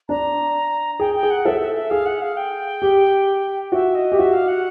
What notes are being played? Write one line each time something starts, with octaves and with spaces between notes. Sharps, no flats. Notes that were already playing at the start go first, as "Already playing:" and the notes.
D4 A#5
G#4 G5
G5
G#4
F#5
A4 E5
E5
E5
G#4 F5
F#5
F5
G5
G4
F#4 E5
D#5
G4
F#4 E5
F5
F#5